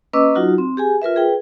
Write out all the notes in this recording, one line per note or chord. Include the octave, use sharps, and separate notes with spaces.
A#3 C#4 B4 D#5 D6 E6
F#3 D#4 F4 F#4
C4
G4 G#4 G#5
F4 A#4 B4 E5
G#4 B4 G5